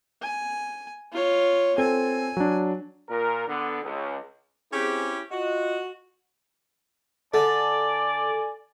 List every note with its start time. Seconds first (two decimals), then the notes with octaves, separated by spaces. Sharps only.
0.22 G#5
1.13 F4 C#5
1.78 C4 A4 G#5
2.37 F#3 D4
3.08 A#2 A#4
3.47 D3 B3
3.82 C#2
4.72 C4 C#4 E4 G4 G#4
5.32 F4 F#4 D#5
7.34 D3 A4 D5 G#5 A6